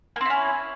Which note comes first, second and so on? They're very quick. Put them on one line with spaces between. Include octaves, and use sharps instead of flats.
A#3 C4 E4 C#4